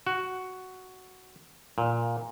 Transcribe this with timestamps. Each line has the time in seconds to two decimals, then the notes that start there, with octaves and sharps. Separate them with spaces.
0.07 F#4
1.78 A#2